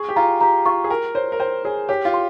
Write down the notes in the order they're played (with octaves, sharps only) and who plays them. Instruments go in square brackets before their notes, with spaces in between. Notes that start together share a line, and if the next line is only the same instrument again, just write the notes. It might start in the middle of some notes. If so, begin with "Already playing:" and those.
Already playing: [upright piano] G#4 [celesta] G#5 C#6
[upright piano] G4
[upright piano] F4 [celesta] A#5
[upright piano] G4 [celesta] A#5
[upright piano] F4 [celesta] C#6
[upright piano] G#4
[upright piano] A#4 [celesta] G5
[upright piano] C5 [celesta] C#5
[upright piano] A#4
[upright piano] C5 [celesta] G5
[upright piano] G#4 [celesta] C#5
[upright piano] G4 [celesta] C#5
[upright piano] F4
[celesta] C6